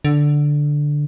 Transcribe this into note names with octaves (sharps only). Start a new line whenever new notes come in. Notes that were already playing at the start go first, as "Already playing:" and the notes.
D3